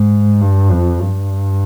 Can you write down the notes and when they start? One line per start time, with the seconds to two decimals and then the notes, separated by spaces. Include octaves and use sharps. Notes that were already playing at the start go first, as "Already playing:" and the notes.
Already playing: G#2
0.41 G2
0.71 F2
1.01 G2